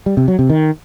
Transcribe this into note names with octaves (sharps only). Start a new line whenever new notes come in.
G3
C3
F#3
C3
D#3